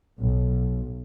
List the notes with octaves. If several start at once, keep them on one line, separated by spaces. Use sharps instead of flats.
B1